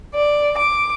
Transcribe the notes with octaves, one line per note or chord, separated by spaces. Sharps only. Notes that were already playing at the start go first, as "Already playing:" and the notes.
D5
D6